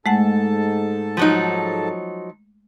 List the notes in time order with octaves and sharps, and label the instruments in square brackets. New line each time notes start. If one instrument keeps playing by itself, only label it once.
[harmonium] G#2 A4 A5 [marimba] G#3 A3 F#5
[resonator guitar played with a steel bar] F3 F#3 D#4